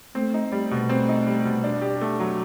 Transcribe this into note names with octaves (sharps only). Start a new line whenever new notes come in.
A3 C4
D#4
G3 A3
B2
C4
D#4
G3
B2
D4
G4
A3
F#3